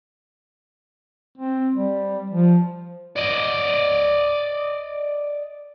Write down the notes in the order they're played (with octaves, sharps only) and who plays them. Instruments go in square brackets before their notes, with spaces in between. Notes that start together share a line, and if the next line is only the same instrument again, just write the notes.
[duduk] C4
G3
F3
[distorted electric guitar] D5 D#5